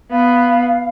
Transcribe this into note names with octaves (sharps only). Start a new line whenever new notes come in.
B3 F5